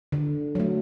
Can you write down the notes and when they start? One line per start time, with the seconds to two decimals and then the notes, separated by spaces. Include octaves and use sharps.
0.12 D3
0.55 F#3 A3